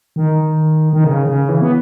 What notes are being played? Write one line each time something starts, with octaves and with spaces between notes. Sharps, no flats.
D#3
D#3
C#3
C#3
E3
B3